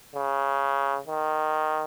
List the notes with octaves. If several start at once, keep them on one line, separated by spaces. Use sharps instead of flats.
C#3
D#3